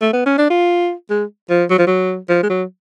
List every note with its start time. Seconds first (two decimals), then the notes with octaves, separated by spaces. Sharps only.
0.02 A3
0.13 B3
0.26 C#4
0.38 D4
0.50 F4
1.10 G#3
1.50 F3
1.70 F#3
1.78 F3
1.87 F#3
2.29 F3
2.43 G#3
2.50 F#3